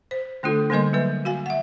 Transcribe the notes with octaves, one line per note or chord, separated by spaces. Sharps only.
C5
D3 A3 D4 F4 A4
D3 G3 A#3 A#4 D#5 C6
F#3 A#3 B4
F#4 F5 G#5
E5 F#5